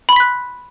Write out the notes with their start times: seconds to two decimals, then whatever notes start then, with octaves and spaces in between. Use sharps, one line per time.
0.09 B5
0.13 C6
0.16 B6
0.20 F#6